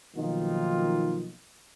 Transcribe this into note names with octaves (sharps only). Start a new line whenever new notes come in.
B1 D#3 F3 A#3 D#4 F4